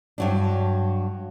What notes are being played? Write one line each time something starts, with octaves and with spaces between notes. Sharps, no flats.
G2 F#3 D4